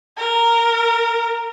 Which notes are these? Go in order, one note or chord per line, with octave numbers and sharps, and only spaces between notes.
A#4